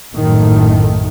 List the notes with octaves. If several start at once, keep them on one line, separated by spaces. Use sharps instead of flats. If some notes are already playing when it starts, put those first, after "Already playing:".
A#1 F#2 A2 D#3 A3